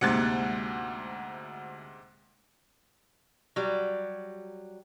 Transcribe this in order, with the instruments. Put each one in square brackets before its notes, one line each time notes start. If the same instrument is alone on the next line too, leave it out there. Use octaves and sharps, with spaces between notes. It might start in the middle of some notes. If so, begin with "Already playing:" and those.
[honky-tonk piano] D2 F#6 A6 [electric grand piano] G#2 C3 C#7 [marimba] G#3 A#3
[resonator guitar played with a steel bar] F#3 G3